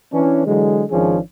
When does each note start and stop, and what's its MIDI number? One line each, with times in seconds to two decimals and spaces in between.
0.12 0.43 52
0.12 0.43 61
0.12 0.43 62
0.45 0.83 50
0.45 0.83 52
0.45 0.83 54
0.45 0.83 56
0.90 1.18 32
0.90 1.18 51
0.90 1.18 53
0.90 1.18 61
0.90 1.18 62
0.90 1.18 68